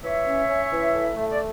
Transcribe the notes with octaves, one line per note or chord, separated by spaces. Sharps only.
E3 C#5 E5
C#4
C#4
E3
A2
A3
D5